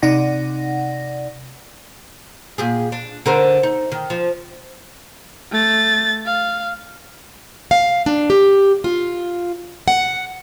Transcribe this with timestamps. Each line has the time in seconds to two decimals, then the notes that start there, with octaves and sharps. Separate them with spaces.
0.02 C3 D#4 D5 F#5 A#6
2.58 A#2 G4 G#4
2.92 D4
3.26 D3 A#4 C5
3.63 D#4
3.92 D#3
4.10 F3
5.51 A3 A6
6.25 F5
7.71 F5
8.06 D4
8.30 G4
8.84 F4
9.88 F#5